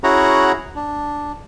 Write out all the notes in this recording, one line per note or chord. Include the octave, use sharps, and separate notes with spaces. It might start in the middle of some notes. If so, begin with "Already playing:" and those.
C#4 E4 F#4 G#4 F#5 A#5
D4